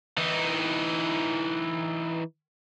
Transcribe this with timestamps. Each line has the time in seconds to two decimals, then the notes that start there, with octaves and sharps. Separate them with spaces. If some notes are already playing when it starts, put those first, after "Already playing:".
0.18 E3 D#4